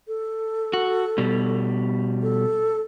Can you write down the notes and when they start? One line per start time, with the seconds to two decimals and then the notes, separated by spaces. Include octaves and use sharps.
0.08 A4
0.73 F#4
1.18 B2 G3
2.22 A4